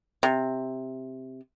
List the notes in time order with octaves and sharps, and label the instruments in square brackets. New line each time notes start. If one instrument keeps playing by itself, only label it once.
[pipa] C3